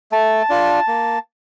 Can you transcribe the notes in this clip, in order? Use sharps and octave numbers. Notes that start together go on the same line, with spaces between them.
A3 A5
D4 F4
A#3